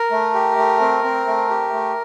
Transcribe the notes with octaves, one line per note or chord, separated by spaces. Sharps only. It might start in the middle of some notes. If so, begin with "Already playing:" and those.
Already playing: A#4
A3
G4
A3
C4
C4
A3
G4
A3